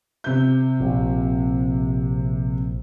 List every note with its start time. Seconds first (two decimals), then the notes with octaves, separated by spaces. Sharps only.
0.24 C3 G6
0.80 A#1